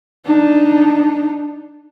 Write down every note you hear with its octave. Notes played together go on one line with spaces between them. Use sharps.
D4 D#4